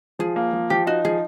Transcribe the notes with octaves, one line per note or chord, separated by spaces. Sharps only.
F3 G#4
A#3
F3
F3 G4
D#4 F#4
F3 G#4